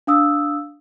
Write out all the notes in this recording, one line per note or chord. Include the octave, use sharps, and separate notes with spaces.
D4 F5 D#6 E6